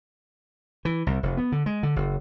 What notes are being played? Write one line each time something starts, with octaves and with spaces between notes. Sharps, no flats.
E3
C2
F1
B3
D3
G#3
D3
F#1